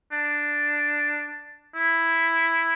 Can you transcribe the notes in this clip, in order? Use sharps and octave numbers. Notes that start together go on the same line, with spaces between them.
D4
E4